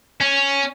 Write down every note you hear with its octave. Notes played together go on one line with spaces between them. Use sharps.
C#4